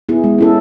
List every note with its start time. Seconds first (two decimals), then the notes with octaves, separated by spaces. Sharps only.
0.09 B3 E4 G#4
0.24 G#3
0.38 C#4 E4 A4